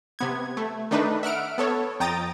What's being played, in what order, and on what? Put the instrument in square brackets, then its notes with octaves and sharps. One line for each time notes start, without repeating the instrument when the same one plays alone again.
[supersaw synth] C3 B3 G#6
A3
D#3 A3 D4 D#4 B4
E5 F#5 F6 D7
B3 A4 C#5
F2 G5 A#5 D#6 A6